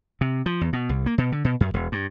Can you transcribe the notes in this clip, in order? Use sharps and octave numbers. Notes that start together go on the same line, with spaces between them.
C3
F3
E2
B2
C2
A#3
B2
D3
B2
F#2
E1
G2